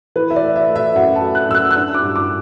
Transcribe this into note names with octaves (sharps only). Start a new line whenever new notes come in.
E3 B4
E5
D5
A3
E5
A3
E5
F#2 F#5
A5
A3
F#6
F#2 E6
F#6
F#6
D4 E6
D6
G2
D6